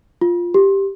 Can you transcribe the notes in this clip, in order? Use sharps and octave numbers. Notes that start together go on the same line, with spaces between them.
F4
G4